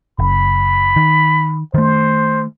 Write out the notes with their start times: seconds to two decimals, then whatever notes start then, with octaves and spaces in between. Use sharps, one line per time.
0.19 F#1 B5
0.96 D#3
1.74 D#3 A3 C5